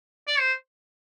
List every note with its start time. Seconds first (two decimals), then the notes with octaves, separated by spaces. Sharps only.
0.27 D5
0.39 C5